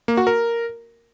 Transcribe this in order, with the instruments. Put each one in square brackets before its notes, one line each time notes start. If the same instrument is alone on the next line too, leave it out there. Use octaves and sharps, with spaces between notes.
[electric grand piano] A#3
F#4
A#4